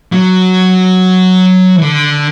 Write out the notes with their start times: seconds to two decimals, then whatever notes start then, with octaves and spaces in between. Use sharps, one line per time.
0.12 F#3
1.76 E3
1.82 D3